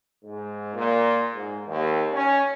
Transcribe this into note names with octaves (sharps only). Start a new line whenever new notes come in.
G#2
A#2
G#2
D#2
C#4